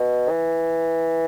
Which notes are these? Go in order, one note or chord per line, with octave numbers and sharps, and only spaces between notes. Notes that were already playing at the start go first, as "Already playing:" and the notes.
Already playing: B2
E3